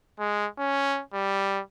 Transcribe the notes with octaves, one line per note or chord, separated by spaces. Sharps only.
G#3
C#4
G3